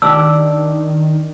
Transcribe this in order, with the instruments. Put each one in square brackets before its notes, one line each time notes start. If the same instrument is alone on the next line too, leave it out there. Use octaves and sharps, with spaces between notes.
[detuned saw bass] D#3 [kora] D4 G4 [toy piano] E6